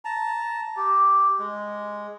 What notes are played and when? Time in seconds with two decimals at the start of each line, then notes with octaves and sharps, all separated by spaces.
0.05 A5 A#5
0.77 G4
1.39 G#3